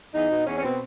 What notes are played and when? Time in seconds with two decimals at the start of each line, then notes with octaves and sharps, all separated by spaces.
0.15 E2 D#4
0.31 B2
0.46 E2 C#4
0.57 C#4
0.63 B2 C4